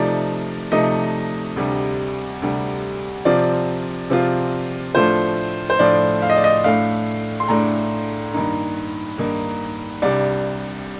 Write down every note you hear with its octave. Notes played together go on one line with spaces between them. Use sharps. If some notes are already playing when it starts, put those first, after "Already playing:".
Already playing: C3 F3 A3 D#4 D5
C3 F3 A3 D#4 D#5
D2 C3 G3
D2 C3 G3
C3 F3 C4 F4 D5
C3 F3 C4 F4
A2 F3 A3 D4 F4 C5
C5
A2 F3 A3 D4 F4 D5
F5
D#5
D5
D#5
A2 A3 D4 F5
C6
A2 A3 D4 A#5
G2 D#3 A#3 D#4
G2 D#3 A#3 D#4
C2 C3 G3 D4 D5